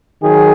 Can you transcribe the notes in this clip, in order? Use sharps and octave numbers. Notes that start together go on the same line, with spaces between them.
D#3 F#3 G#4